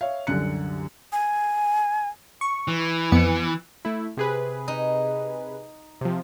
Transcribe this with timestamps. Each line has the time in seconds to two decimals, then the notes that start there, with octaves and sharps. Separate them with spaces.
0.01 C#5 E5 F5
0.27 C2 F#2 D3 F#6 C#7
1.13 G#5
2.41 C#6
2.68 E3
3.12 F2 B3 C#7
3.85 A3 E4
4.17 C3 G#4 B4
4.68 D#4
6.01 C3 F3